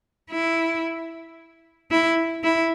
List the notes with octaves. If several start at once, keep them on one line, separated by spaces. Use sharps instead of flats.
E4
E4
E4